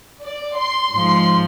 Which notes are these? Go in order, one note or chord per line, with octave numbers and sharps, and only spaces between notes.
D5
C6
G#2 F3 C6